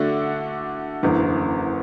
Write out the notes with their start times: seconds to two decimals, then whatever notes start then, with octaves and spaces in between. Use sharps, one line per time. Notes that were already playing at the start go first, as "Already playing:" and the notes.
Already playing: D3 A3 D4 F#4
1.03 F#1 E2 D3